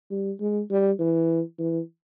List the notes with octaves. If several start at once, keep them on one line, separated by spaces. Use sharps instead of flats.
G3
G#3
G3
E3
E3